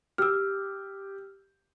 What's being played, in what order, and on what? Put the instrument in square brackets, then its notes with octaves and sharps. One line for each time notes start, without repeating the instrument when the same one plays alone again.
[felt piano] G4 [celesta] E6 F6